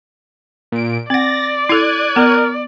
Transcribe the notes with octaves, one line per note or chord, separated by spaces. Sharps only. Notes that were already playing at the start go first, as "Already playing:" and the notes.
A#2 D7
C4 D5 F#5 A6 A#6
E4 A4 F#6 G#6 D#7
B3 A#4